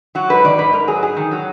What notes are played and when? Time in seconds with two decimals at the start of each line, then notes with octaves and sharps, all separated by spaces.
0.15 F#3 F#4
0.30 G#2 B4
0.44 D#3 D5
0.58 G#2 B4
0.73 G#2 A#4
0.87 F#3 G#4
1.02 G#2 G#4
1.17 D#3
1.31 F#3